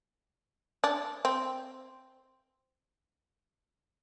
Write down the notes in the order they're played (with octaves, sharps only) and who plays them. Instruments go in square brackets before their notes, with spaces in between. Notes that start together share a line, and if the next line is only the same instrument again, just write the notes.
[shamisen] D4
C4